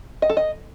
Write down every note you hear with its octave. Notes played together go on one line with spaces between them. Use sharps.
D#5
A4
D#5